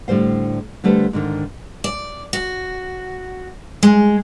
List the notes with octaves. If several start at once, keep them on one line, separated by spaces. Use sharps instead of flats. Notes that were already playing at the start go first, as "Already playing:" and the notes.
A2 D3 G3 C5 F5
D3 G3 A3 A4 B4 C5
G#2 D3 D#3
D5
F#4
G#3